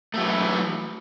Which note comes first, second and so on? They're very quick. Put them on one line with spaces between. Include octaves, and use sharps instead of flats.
A3 F#3 E3